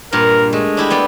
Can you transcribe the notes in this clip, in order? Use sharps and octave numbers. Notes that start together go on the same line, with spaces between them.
G2 A#2 A#4
G#3 A3
D4 E4 G4
G3 B3 D5